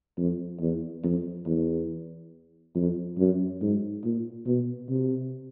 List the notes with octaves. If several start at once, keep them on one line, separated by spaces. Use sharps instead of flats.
F2
E2
F2
E2
F2
F#2
G#2
A#2
B2
C3